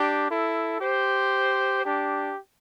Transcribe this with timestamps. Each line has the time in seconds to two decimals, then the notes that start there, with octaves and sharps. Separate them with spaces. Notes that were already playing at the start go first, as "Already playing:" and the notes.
Already playing: D4 G4
0.30 E4 A4
0.80 G4 C5
1.84 D4 G4